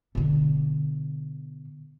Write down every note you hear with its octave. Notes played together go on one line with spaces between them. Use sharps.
B2 D3